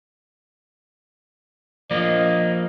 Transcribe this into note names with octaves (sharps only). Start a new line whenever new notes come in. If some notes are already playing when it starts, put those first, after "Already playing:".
F3 A#3 D#5